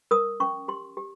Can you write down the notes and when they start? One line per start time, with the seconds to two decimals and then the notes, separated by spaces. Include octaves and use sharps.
0.11 A#4 D#6
0.40 C#4 C#6
0.68 G4 C6
0.97 G4